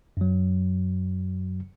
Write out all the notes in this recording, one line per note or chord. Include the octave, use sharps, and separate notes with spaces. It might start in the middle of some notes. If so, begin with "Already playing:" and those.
F#2 F#3